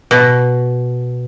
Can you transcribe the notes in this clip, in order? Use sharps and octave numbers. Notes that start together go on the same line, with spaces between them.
B2